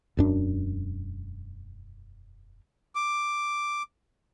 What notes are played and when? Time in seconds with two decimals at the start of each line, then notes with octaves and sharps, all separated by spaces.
0.17 E1 F#2 D4
2.95 D6